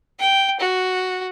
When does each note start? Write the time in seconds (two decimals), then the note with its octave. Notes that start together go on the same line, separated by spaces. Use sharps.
0.19 G5
0.60 F#4